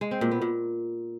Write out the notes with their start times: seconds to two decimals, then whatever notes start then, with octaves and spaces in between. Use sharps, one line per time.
0.01 G#3
0.11 C4
0.21 A#2
0.31 B3
0.42 A#2